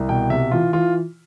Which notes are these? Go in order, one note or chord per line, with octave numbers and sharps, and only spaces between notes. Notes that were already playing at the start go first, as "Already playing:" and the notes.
Already playing: C2
B2 G5
C3 E5
E3 F4
E3 F4